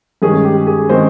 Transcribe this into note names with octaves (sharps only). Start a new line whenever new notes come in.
G2 D#3 G#3 C#4 G#4
G4
G#4
D#3 G#3 C4 C#4 C5